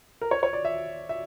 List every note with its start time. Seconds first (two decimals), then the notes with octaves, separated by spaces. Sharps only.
0.21 A#4
0.31 C#5
0.43 C#5
0.53 D5
0.65 E5
1.09 E5